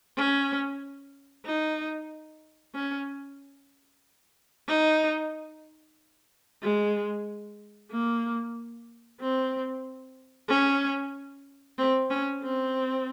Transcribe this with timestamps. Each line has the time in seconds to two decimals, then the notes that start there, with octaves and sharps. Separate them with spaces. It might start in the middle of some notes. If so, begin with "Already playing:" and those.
0.17 C#4
1.46 D#4
2.75 C#4
4.68 D#4
6.63 G#3
7.91 A#3
9.21 C4
10.49 C#4
11.78 C4
12.10 C#4
12.43 C4